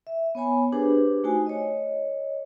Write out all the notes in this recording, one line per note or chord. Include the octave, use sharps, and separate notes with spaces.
E5
B3 C#5 G#5 B5
D4 G4 G#4 B4 C5 D6
A3 D#4 F#4 C5 G#5
C#5 D#5